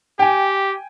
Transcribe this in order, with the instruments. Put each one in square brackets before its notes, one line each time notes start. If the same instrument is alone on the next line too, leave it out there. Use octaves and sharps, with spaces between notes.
[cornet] G4 [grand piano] G5 G#5